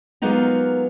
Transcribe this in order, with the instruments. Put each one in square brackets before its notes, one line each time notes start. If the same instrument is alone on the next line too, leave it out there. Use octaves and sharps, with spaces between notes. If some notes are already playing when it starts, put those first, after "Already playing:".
[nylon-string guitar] F#3 G#3 A#3 B3 D#4 F4